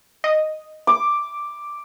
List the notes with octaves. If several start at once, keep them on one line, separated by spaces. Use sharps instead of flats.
D#5
D6